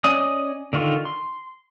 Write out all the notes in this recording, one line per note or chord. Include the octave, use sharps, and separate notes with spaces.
C#4 D5 D#5 G#5 D#6
D3 D#3 F4 C#6
C6